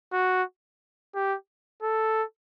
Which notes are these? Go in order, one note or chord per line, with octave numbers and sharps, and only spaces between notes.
F#4
G4
A4